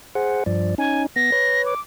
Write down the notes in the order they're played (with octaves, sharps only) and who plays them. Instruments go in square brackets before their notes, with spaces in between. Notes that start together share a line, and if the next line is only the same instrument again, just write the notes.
[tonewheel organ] G#4 C5 F#5
G2 F3 D5
[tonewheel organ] C#4 D#4 [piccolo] G#5
[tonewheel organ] B3 [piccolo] A#6
[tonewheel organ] B4 C#5
[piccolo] D6